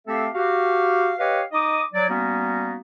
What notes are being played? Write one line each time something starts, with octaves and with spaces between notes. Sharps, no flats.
A3 C4 G4 A4 E5 F5
F#4 G4 F5
G4 B4 C#5 D#5 F5
D#4 D#5 D6 D#6
F#3 D5
G3 A#3 B3 C#4 D#4 F#4